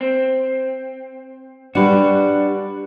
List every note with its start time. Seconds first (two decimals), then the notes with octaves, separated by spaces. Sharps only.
0.01 C4
1.75 G3 D4 F#4 B4